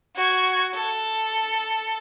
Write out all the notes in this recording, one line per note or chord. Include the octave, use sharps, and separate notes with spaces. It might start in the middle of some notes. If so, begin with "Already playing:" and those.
F#4 G#6
A4